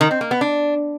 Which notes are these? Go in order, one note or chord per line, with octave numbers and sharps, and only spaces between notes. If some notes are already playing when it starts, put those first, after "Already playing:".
D#3
C4
A#3
B3
D4